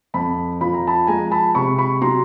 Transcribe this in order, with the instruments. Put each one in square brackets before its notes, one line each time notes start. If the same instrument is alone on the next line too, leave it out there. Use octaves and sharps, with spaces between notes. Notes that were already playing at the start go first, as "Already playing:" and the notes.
[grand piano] F2 A5 B5
F3 B5
A#5
A5 B5
G#3 G#5 A#5
A5 B5
C3 B5 C#6
B5 C#6
F#3 A#5 C6